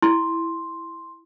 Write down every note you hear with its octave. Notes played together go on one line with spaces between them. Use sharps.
E4 C6